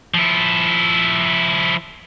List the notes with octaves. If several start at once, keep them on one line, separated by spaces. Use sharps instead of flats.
F3 E4